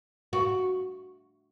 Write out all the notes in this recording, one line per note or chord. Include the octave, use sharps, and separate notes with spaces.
F#4